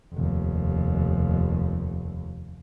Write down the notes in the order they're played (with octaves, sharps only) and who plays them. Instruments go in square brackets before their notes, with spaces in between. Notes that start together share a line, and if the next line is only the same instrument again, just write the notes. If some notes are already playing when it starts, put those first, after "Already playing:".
[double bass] F1 D#2